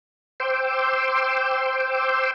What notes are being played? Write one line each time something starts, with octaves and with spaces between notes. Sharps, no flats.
C5 G5 C6 D6 E6